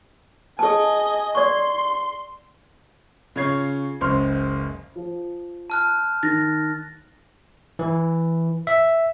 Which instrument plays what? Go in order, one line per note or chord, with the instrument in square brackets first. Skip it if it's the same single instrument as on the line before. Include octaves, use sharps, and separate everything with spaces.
[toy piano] G#4 A5 [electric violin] D#5 G#5
[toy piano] D5 C#6 [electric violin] C6
[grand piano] C#3 F4 C#5 G#6 C7
F#1 C#2 C5 C6 F6
[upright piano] F3
[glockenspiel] A5 F6 F#6
[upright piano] D#3 [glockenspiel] A6 A#6
[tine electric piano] E3
E5